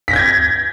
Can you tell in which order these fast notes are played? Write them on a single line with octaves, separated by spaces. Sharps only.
B6 A#6 G6 G#6